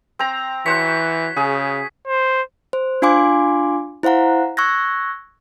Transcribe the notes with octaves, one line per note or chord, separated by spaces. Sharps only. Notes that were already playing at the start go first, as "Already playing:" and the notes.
C4 A#5
E3 F#4 C5 C#5 B6
C#3 G#4
C5
C5
D4 F4 F5 G#5 C6 D6
E4 C5 F5 F#5 A#5
C#6 E6 F#6 G#6 A#6